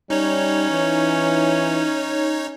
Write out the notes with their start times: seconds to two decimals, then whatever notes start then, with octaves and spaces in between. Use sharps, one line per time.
0.10 G3 C#4 D#4 C#5
0.71 E3